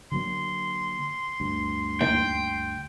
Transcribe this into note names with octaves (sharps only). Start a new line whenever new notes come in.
D3 F#3 A#3 C6
D2 G2
D#2 G5